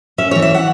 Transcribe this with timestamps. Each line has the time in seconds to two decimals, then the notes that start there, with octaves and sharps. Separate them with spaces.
0.18 C#4 E5
0.31 E3 C#5
0.42 E5
0.54 F#5